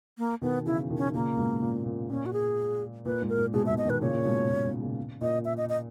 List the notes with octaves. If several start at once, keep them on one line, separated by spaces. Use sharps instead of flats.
A#3
B2 D#3 B3
C#3 E3 E4
B2 D#3
C#4
D#3
A#2 C#3 A#3
G#2 B2
A#2
A#2
A#2 C#4
F#4
G#4
A#2 B4
G#2
A#4
A#2
G#2 B2 G#4
G#2 B2 E5
D#5
B2 D#3 B4
A#2 C#3 C#5
A#2
G#2 B2
A#2
G#2
A#2 C#3
A#2 D#5
E5
D#5
D#5